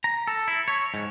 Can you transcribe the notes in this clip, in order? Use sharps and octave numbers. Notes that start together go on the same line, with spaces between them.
A#5
A4
E4
C#5
G#2